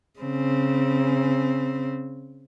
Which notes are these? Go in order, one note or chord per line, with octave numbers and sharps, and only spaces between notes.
C#3 C4